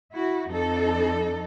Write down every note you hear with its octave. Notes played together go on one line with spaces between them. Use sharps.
E4 F#4
F2 D#4 A4